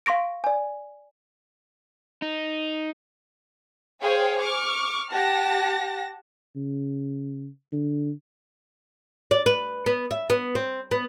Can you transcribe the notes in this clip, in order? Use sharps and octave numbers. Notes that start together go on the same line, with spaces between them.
F5 C6 C#6 A#6 D7
D5 G#5
D#4
G#4 C5 C#5 F5 G5
C#6 D6 F6
G4 F#5 A5 A#6
C#3
D3
D5
B4
B3
E5
B3
C4
B3